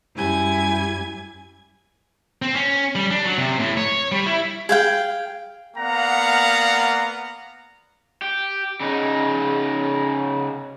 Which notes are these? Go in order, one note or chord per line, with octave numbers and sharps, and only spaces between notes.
F#2 G3 E4 G4 G#5 G#6
C4
C#4
G3
D4
F#3
C3
A2
C#5
G3
E4
G#4 F5 G5
A#3 B3 D5 F5 F#5 A#5
G4
C#3 D#4